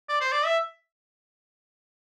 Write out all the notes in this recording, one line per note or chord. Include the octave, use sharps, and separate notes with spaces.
D5
C5
D5
E5